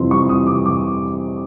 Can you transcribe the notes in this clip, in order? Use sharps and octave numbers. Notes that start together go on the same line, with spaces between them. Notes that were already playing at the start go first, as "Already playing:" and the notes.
Already playing: F2 C3 E3 G3 C6
G3 C#6
E3 D#6
C3 D6
F2 D6